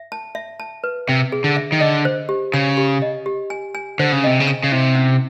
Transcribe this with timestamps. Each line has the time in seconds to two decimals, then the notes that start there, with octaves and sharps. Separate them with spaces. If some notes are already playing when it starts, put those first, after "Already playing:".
Already playing: E5
0.12 A5
0.35 E5
0.60 A5
0.84 B4
1.08 C3 E5
1.32 G#4
1.44 D3
1.56 E5
1.72 D#3
1.80 D3 D#5
2.05 C5
2.29 G4
2.54 C#3 G#5
2.77 G4
3.02 D#5
3.26 G4
3.50 G#5
3.75 G#5
3.99 D3 C5
4.12 C#3
4.24 C3 D#5
4.40 C#3
4.48 G#5
4.63 C#3
4.72 C3 E4
4.95 C#4